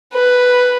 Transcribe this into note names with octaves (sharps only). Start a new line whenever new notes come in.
B4